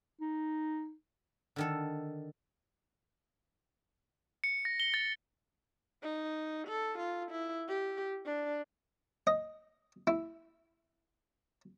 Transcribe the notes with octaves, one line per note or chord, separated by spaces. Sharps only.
D#4
D3 D#3 A4
C#7
A#6
G7
A6
D#4
A4
F4
E4
G4
D4
D#5
E4